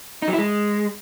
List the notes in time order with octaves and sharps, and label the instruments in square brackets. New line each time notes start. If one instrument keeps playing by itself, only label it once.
[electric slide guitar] D#4
F#3
E4
G#3